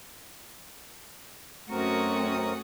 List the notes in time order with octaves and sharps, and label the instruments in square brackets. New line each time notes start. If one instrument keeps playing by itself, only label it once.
[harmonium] F#2 C4 A#4 [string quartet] A3 C#4 C#6 [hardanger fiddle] F#4 D#6